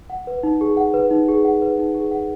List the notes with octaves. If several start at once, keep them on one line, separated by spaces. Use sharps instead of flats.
F#5
B4
D#4
G#4
F#5
B4
D#4
G#4
F#5
B4
D#4
G#4
F#5